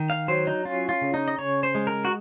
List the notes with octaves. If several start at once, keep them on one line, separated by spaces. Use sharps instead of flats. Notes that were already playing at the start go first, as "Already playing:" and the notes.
Already playing: D#3
F5
F#3 C5
D#4
C#4 F4
F4
C#3
D#4
D#5
C#3 C#5
C5
G#3
A#4
F#4